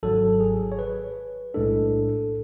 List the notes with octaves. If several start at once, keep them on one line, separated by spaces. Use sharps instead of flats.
G#1 G#2 F#3 A4
G#4
C#5
B4
B1 A2 G#3 D4 A4